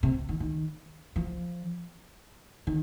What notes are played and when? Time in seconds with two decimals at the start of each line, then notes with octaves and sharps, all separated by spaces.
0.03 C3
0.29 D#3
0.40 D#3
1.16 F3
2.67 D#3